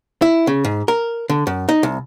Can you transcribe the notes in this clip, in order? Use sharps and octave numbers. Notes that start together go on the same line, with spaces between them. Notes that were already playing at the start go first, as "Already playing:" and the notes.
E4
C#3
G#2
A#4
D3
F#2
D#4
C2